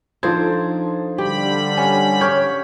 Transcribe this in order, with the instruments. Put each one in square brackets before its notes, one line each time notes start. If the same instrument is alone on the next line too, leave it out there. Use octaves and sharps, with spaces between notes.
[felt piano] F3 G#6 [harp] D4 D#4 A4 [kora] C5
[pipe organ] D3 G3 B5 [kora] G4
[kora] C#4 [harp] F#5
[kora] C#5 [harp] D6 F6 G6